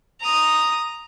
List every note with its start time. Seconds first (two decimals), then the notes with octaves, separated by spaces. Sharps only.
0.21 A#5 D#6